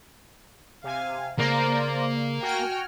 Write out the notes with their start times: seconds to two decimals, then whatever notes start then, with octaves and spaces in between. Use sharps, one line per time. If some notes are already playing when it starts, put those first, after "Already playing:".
0.84 C3 F5 G#5
1.39 C#3 A#3 C5 D5 F5 A#5
2.43 F#4 G5 G#5 F6